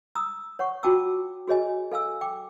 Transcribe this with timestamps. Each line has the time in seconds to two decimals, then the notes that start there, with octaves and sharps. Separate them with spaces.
0.15 A#5 D#6 E6
0.59 C#5 F#5 C#6
0.83 F4 F#4 G5 A5 D6 E6
1.48 F#4 G#4 C#5 D#5 G#5
1.92 A4 F5 G#5 E6
2.21 G5 D6